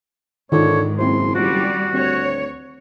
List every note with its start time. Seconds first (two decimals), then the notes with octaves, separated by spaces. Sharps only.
0.52 G#2 D3 D#3 F4 C#5
0.99 F#1 C4 E4 C5 C6
1.35 G3 F4 F#4 D5
1.94 D2 C4 C#5